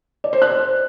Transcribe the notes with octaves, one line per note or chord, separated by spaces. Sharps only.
D5
C5
F#6
C5